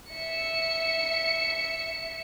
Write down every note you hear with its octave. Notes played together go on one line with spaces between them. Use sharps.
E5 C#7